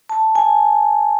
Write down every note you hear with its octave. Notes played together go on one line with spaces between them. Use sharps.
A5
G#5